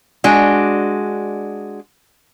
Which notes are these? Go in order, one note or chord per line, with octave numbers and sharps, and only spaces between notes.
G#3 D4 F#4